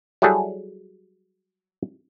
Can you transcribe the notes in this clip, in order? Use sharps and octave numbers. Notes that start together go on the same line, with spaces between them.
F#3 G3 E4 F#4 G#4 A4